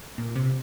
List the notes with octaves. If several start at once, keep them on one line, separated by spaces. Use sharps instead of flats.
A#2
C3